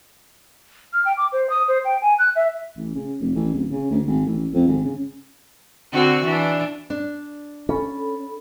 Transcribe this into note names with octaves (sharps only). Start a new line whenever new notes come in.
F6
G5
D6
C5
D#6
C5
G5
G#5
F#6
E5
A1
C#3
F1
A1
D1
C#3
D2
G#1
A1
F2
G#1
C#3
D3 C4 F#4
E3 D4
D4
C#4 A4 B5